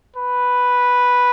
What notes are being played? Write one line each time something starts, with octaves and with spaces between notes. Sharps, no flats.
B4